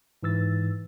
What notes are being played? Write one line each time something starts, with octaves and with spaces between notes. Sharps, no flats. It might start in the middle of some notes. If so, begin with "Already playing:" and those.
G#2 E3 E6 A6